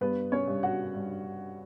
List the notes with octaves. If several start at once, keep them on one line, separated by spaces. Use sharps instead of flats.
G2 B3 B4
C#4 C#5
G2
F#4 F#5
G2